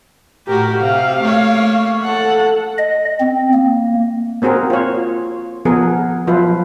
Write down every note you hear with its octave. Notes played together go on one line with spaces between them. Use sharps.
A2 F#4 G4 A#4
C3 F5
A3 A#3 C#5
A4 F#5
D#5
C4
A#3
A#3 C4 F#4 G#4 A#4
F4 C#5
F3 B3 G#4 A#4
F3 F#3 F4 B4